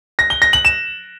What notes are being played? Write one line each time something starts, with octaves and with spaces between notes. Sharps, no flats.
A#6
G7
A#6
F#7
E7